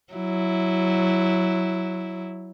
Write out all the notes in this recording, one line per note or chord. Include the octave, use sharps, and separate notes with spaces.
F#3 E4